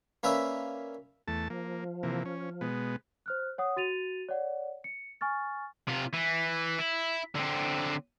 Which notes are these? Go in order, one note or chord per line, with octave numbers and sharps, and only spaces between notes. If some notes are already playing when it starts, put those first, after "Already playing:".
A#3 C#4 B4 D5 E5
E2 A3 A5
F3 A#3
C3 E3 A#3
C#4
B2 G#3 B3
C5 F6 F#6
C#5 F#5 D#6
F#4 A6 D#7 F7
C#5 D5 F#5
C#7
G#5 C#6 F6 A6
C3 F4
E3
E4
D3 C4